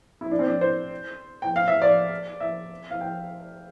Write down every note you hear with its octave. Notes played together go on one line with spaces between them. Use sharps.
E4
D4
C4
D4
C5
G5
F5
E5
D5
E5
F5
G5